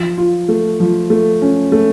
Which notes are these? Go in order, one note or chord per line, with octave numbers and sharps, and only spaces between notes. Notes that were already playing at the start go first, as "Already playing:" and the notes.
Already playing: F3
F4
A3
F3
A3
C#4
A3